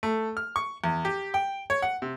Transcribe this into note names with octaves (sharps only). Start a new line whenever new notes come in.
A3
F6
C#6
E2
G4
G5
C#5
F#5
C3